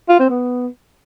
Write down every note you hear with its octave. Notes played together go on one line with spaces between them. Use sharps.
F4
C4
B3